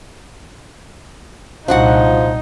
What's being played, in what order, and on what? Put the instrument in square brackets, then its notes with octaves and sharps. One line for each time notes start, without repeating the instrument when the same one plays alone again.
[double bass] C2 A#2 [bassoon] F3 [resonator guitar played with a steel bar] D4 F#4 F#5 [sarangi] D#4